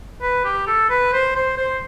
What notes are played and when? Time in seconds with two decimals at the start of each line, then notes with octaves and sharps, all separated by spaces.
0.22 B4
0.44 G4
0.67 A4
0.90 B4
1.13 C5
1.35 C5
1.57 C5